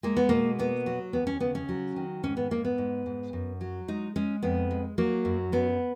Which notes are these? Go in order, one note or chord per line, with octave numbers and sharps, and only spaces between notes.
G#3 A#3
B3
B2 A#3
A#3 B3
F#3
D#2 B3
C#4
C#3 B3
C#4
F#3
D#3
G#2 C#4
B3
G#2 A#3
B3
G#2
G#2
F#2
F#3
G#3 D#4
G#3 C#4
F2 B3
G#3
F#3 A#3
F#2
F#2 B3